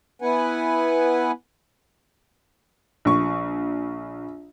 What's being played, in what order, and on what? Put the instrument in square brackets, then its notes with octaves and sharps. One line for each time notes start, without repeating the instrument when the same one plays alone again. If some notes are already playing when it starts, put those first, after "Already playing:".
[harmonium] B3 E4 B4 F#5 G#5
[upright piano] A#1 C#6